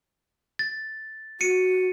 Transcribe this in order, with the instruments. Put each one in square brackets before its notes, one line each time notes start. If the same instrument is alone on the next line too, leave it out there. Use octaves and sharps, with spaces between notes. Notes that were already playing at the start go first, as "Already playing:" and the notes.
[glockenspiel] A6
[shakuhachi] F#4 [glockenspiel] C#7 D#7